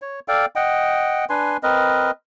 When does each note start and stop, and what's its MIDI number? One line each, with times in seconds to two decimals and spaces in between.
0.02 0.20 73
0.28 0.46 69
0.28 0.46 74
0.28 0.46 77
0.28 0.46 79
0.56 1.25 75
0.56 1.25 78
0.56 1.25 79
1.30 1.57 62
1.30 1.57 71
1.30 1.57 80
1.30 1.57 84
1.63 2.11 60
1.63 2.11 70
1.63 2.11 71
1.63 2.11 75